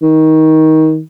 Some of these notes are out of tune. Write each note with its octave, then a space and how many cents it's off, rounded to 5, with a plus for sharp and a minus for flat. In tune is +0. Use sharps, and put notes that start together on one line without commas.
D#3 +20